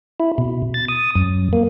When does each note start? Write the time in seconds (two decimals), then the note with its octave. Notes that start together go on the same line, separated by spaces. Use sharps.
0.20 E4
0.38 B2
0.74 A6
0.88 D#6
1.15 F#2
1.53 A#3